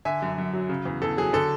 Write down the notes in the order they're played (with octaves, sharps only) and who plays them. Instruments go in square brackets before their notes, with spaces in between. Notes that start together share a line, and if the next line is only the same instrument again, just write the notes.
[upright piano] D3 E5 G#5
F#2
F#2
F#3
C#3
E2
E2 A4
F#3 G#4
D3 A4